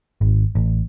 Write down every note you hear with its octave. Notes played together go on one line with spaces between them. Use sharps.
G#1
A1